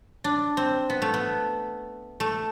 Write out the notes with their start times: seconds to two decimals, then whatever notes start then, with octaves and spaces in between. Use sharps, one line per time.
0.24 D4
0.57 C4
0.90 B3
1.02 A3
1.14 B3
2.20 A3